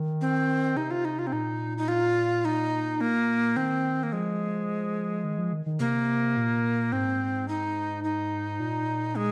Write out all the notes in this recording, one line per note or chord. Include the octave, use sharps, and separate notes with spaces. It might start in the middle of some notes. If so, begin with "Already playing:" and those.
Already playing: D#3
C4
C3 D#4
F4
D#4
F4
C4
A#2 D#4
D#4
F4
D#4
A#3
D#3 C4
A#3
F3 G#3
D#3
F3
D#3
D#3
C3 A#3
A#2
G#2 C4
D#4
D#4
A#2
G#3